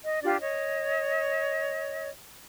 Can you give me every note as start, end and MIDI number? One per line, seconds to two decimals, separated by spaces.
0.05 0.21 75
0.23 0.36 62
0.23 0.36 65
0.23 0.36 67
0.23 0.36 74
0.40 2.10 73
0.40 2.10 75